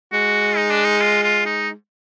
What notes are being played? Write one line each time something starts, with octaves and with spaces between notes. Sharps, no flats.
G#3 F#4
D#4
D4
D#4
F4
F4
D#4